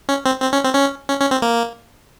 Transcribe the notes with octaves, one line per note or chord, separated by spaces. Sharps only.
C#4
C4
C4
C#4
C4
C#4
C#4
C#4
C4
A#3